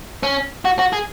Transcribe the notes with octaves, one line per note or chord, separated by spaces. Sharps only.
C#4
F#4
F#4
G#4